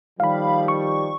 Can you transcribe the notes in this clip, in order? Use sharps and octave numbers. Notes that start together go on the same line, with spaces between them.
D#3 F3 G3 F5 B5
C#6